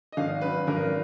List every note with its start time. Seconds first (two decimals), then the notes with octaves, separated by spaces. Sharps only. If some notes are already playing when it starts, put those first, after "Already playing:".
0.12 D#5
0.17 G#1 F5
0.41 F#2 B4
0.67 G#1 A#4